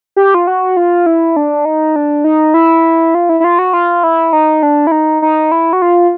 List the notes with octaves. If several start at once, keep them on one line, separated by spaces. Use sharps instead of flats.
G4
F4
F#4
F4
E4
D4
D#4
D4
D#4
E4
F4
E4
E4
F4
F#4
F4
E4
D#4
D4
E4
D#4
D#4
E4
F#4
F4